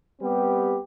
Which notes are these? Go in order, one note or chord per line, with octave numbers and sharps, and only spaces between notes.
G3 B3 C4 G4 B4